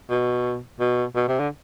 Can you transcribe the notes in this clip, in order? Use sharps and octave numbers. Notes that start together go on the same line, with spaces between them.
B2
B2
B2
C3
D3